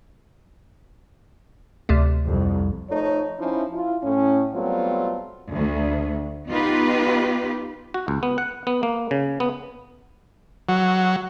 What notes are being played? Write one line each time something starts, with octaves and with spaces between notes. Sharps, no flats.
D2 C3 A3
C2 F2
F3 A3 D#4 A4 C#5
F3 C#4 D#4 E4
E4 F4
A2 C#4
F#3 G3 A3 B3 C4 F4
D2
B3 D#4 F4 G4 B4
F#4
C#2
B3
F#5
B3
A#3
C#3
B3
F#3